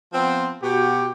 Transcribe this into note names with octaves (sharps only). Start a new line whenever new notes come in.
F3 B3 C4
B2 F#4 G4